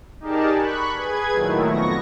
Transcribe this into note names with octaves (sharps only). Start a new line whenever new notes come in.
D#4 G4 G#4 A#4 D5 A5
B5 C#6 F#6
G#4 B4 G#6
A#2 D#3 F#3 A3 E4
F2 B3 C#6 A#6